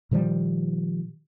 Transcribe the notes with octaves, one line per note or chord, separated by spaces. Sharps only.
A#2 D#3 F3 G3